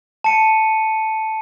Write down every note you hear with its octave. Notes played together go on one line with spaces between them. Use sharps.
A5 C#7 D#7